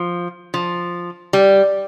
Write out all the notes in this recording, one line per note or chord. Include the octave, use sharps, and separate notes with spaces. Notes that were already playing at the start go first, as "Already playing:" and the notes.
Already playing: F3
F3
G3